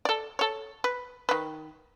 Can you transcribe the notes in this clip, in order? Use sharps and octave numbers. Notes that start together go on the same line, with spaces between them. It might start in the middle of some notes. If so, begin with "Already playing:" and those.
A4 D5
A4 C#5
B4
D#3 B4